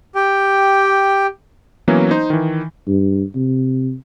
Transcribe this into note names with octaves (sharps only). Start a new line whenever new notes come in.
G4 G5
E3 F#3 A#3 B3 C#4
D#4 C5
D#3 E3
G2
C3